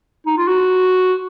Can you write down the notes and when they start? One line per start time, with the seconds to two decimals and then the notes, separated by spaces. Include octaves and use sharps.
0.27 D#4
0.37 F4
0.48 F#4